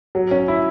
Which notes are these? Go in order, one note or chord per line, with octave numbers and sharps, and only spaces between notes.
F#3
C#4
E4